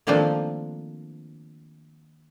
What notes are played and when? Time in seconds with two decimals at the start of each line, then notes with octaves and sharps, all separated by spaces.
0.07 D#3 F3 A3 A#3 C4 D4